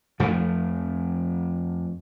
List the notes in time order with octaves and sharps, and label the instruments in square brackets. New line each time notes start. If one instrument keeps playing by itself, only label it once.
[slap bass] F2 F3 A3